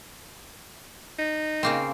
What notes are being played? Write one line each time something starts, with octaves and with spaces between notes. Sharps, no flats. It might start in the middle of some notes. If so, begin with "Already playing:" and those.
D#4
C#3 A#3 C4